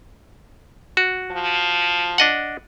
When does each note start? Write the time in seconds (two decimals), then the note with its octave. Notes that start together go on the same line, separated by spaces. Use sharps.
0.97 F#4
1.31 F3
2.18 D4 D#5 F#5